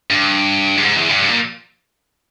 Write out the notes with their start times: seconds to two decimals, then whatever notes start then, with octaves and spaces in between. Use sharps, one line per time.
0.10 G2
0.78 G2
0.83 G#2
0.96 E2
1.09 G2
1.23 G2
1.29 A#2